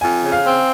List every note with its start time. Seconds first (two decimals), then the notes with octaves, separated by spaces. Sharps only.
0.01 F2 G#5
0.22 C#3
0.32 F5
0.43 C4